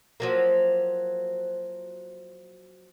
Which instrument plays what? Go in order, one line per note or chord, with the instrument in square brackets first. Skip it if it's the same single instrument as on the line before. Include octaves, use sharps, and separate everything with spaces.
[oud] F3 F#3 A#3